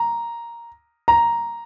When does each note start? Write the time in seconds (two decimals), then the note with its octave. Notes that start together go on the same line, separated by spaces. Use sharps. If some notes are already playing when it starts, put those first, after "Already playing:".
Already playing: A#5
1.08 A#5